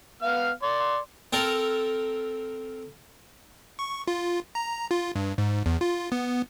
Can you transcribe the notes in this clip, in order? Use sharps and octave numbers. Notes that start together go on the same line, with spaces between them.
B3 F5 F6
D5 C6
C4 A4 A#4
C#6
F4
A#5
F4
G2
G#2
E2
F4
B3